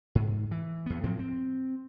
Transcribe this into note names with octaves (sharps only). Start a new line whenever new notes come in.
G#2
E3
E2 B3
A2 F3 F#3 C4
C4